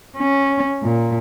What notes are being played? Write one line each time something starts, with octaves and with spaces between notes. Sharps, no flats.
C#4
A#2